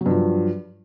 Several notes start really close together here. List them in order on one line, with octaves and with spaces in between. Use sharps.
F#3 G2 F3